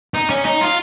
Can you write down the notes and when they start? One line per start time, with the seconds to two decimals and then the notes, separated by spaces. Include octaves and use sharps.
0.14 D#4
0.30 C#4
0.45 D#4
0.61 F4